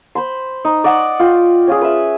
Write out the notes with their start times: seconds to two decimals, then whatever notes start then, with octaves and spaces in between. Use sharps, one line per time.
0.15 C5 B5 C6
0.65 D#4
0.84 D5 D#5 F#5 C#6
1.20 F4 G5
1.67 C#4 F4 G#4
1.81 B4 E5